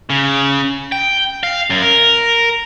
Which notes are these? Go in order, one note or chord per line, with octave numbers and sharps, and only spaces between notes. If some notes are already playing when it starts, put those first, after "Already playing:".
C#3
G5
F5
F#2
A#4